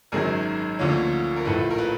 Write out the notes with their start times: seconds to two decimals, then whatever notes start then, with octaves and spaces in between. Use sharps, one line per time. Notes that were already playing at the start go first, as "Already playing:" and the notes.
0.12 G#1 F#2 D#3 F#3 G#4 A#4
0.79 D2 D3 F3 A#3 C#4
1.36 A#4
1.45 A#1 A2 F3 A3 A4 B4
1.70 A#4
1.78 A4 B4